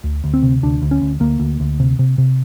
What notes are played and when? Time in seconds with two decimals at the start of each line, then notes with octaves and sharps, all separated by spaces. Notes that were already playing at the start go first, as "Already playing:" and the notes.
0.04 D2
0.24 D2
0.34 C4
0.43 C3
0.63 D2 D4
0.82 D2
0.91 C#4
1.02 D2
1.20 D2 A#3
1.40 D2
1.60 D2
1.80 C3
1.99 C3
2.18 C3